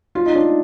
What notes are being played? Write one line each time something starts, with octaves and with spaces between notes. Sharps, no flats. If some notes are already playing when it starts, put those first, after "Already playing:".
F4
D#4
D4